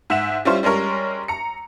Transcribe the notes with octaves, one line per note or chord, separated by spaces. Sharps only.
G#2 E5 F#5 E7
G3 C#4 E4 F4 C5
G3 G#3 C#4 A#4 C#5
A#5 C#7